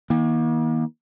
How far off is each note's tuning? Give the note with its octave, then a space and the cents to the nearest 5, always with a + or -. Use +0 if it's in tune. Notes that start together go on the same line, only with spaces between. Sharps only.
D#3 +40 A#3 +40